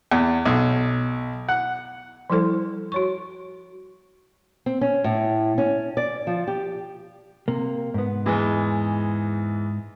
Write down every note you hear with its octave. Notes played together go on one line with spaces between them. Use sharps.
E2
B1
F#5
F3 G3 E4 A4 C5
F#4 C#5 C#6
C4
C#4
A2
C#4
D5
F3
G4
C3 A#3
G#2 B3
E2 E3 G#3